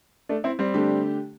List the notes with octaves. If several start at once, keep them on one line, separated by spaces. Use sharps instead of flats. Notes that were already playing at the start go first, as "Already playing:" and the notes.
A3 D4
C4 E4
G3 C4
D3 A3 D4 G4